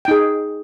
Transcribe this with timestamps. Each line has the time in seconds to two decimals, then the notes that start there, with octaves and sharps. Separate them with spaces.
0.05 G5
0.08 D#4
0.11 G#4